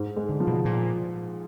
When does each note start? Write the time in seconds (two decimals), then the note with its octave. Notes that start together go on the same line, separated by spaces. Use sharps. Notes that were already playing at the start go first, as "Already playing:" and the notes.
Already playing: G#2
0.16 G#3
0.29 D3
0.40 F3
0.47 B2
0.65 A#2